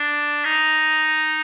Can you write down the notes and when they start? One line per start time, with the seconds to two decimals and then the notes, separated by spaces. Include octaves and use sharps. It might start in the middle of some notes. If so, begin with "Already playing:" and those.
Already playing: D4
0.45 D#4